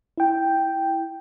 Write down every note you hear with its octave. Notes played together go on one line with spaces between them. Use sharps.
E4 G5